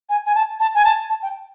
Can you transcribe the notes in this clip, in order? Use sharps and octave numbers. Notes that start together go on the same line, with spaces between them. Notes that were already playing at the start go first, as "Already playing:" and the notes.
G#5
G#5
A5
A5
G#5
A5
A5
G5